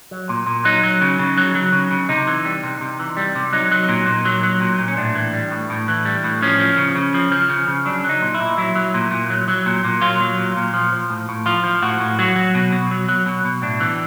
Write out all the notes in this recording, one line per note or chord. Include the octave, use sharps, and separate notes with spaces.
F#3
A#2
A#2
F#3 D#4
F#3
C#3
C#3
F#3
F#3
C#3
C#3
C3 D#4
E3
G3
C3
C3
E3
G3
C3
F#3 D#4
F#3
A#2
A#2
F#3
F#3
A#2
A#2
C#4
A2 D4
E3
G3
A2
A2
E3
G3
A2
F3 C#4
F3
C#3
C#3
F3
F3
C#3
C#3
F#3 D4
F#3 D#4
A#2
E4
A#2
F#3 E4
F#3
A#2
A#2
F#3
F#3
A#2
A#2
F#3 F4
F#3
A#2
A#2
F3
F3
A2
A2
F3 F4
F3
A2 F#4
A2
F#3 F#4
F#3
B2
B2
F#3
F#3
B2
B2
A2 D4
E3